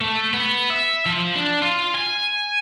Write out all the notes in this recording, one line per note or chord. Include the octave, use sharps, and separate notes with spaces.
A3
B3
E5
F3
D4
F4
G#5